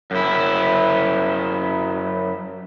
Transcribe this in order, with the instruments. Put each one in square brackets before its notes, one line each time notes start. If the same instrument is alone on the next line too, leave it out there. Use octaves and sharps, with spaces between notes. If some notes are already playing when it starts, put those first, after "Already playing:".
[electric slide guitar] F#2 E4